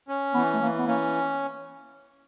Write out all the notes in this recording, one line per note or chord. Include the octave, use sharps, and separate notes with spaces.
C#4
E3 B3
A3
E3 A#3
B3
A#3 C#4